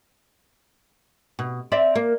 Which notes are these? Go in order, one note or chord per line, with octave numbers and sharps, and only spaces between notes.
B2
C4 D5 E5
A#3